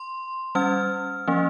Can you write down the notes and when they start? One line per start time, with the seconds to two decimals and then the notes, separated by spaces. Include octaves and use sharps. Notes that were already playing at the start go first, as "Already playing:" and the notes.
Already playing: C6
0.55 G3 C#4 F6
1.28 F3 A#3 C#4